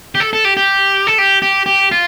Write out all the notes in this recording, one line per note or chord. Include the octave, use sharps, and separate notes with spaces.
G4
A4
A4
G4
G4
A4
G4
G4
G4
F4